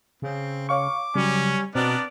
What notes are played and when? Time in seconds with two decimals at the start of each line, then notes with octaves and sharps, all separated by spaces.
0.22 C#3 C4
0.69 C#5 F5 C#6 D6
1.15 C#3 F#3 G3 C#4
1.75 B2 B3 C4 D4 A#4 D5